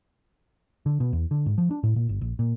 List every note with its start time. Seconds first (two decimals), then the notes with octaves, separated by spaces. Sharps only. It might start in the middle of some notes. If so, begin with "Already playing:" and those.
0.86 D3
1.00 B2
1.13 E2
1.31 D3
1.46 G#2
1.58 F3
1.71 D4
1.83 A2
1.96 A#2
2.09 G1
2.21 A#1
2.39 A#2